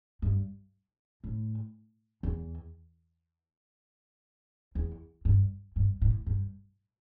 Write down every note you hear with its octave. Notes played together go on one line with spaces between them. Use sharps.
G2
A2
E2
E2
G2
G2
A2
G2